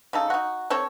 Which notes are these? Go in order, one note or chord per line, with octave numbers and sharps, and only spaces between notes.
C#3 D#4 A4
D#4 F#4
C4 A4 C#5